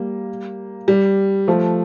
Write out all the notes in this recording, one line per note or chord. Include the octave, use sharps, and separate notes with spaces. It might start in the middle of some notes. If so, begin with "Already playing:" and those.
Already playing: G3 A#3
G3
F3 A3